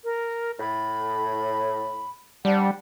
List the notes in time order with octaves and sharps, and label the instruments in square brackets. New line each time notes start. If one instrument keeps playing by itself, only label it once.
[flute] A#4
[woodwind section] A2 [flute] B5
[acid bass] G3 [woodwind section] C4 D4 [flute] F#5